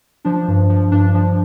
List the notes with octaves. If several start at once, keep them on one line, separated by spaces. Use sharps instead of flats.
F3 D4
G2
F3
G2 D4
F3